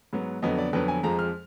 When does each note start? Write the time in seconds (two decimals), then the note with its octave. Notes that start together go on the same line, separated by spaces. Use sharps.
0.13 G#2 F#3 B3
0.42 F2 D3 F#3 B3 D#5
0.58 D5
0.73 F2 D3 F#3 B3 B4
0.88 G#5
1.03 F2 F3 G#3 A#5
1.19 F6